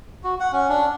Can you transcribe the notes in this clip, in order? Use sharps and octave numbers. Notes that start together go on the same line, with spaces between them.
F#4
F#5
C#4
D4